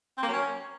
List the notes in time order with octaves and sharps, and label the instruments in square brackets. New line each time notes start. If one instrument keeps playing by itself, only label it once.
[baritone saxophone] C4
A#3
F#3
C#4